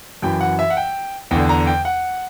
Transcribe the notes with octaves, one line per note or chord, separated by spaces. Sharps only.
F#2 E3 G5
F#5
E5
F#5
G5
E2 D3 G5
A#5
G5
F#5